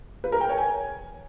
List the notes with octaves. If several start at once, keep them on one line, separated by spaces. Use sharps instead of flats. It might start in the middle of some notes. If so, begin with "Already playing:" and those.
B4
A#4
G5
C#5
G#5